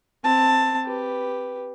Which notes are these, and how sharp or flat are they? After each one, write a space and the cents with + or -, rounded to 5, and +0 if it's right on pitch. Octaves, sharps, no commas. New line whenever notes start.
C4 +0 A5 +15
G4 +0 B4 +0